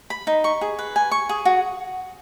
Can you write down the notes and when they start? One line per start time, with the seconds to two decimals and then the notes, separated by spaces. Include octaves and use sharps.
0.10 B5
0.27 D#4
0.44 C#6
0.61 G#4
0.79 B4
0.96 G#5
1.11 C#6
1.29 G#4
1.45 F#4